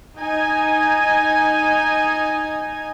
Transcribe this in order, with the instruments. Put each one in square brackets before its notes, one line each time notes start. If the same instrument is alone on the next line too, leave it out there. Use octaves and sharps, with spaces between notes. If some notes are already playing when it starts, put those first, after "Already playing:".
[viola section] D#4 G#5